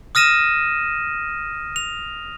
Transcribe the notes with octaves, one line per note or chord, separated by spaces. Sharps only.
D#6 F6 A#6 D#7 E7
F7